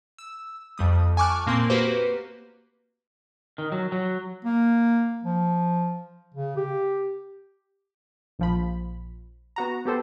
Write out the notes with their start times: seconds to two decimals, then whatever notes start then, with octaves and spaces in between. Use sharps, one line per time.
0.18 E6
0.78 F2 G3 D#6
1.17 G#5 A5 C#6 D6 F6 F#6
1.47 A#2 A#3 C4 C6
1.70 A#3 F#4 G4 B4 C5
3.58 D#3
3.72 F#3
3.92 F#3
4.45 A#3
5.24 F3
6.34 C#3
6.57 G4
8.39 A#1 F3 B5
9.56 B3 F#4 A#5
9.85 B3 G4 A4 C5